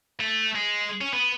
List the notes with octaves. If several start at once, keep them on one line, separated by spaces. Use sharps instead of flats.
A3
G#3
C#4
B3